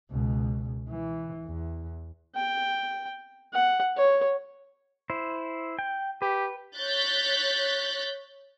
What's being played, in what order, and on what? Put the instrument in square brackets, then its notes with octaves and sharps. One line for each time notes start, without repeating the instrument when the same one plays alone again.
[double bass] C#2 B2
E3
E2
[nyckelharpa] G5
F#5
C#5
[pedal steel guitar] E4 C5
G5
[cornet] G4 [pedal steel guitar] B4
[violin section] C#5 F#6 G6 A6 B6